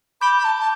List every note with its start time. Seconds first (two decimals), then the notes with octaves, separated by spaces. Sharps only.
0.21 B5 D6 G6 D7 G7
0.39 B5
0.44 A5
0.60 A5